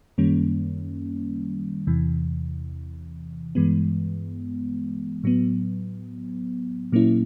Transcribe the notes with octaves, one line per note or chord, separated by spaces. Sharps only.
F#2 D#3 G3 A#3 C#4
E2 C3 E3
G2 E3 G#3 B3
A2 F#3 B3
A#2 F#3 A#3 C#4 E4